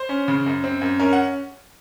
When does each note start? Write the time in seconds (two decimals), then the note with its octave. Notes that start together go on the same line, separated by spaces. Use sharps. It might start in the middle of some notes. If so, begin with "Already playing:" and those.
Already playing: C5
0.09 C#4
0.28 C#3
0.46 F#2
0.64 C4
0.81 F#2
1.00 C#4 A#4
1.13 F#5